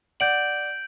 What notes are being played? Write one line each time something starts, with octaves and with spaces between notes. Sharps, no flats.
D5 F#5 G6 D7 F#7